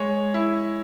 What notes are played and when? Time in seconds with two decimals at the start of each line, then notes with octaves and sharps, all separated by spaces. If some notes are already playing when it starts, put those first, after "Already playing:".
Already playing: G#3 C#5
0.34 E4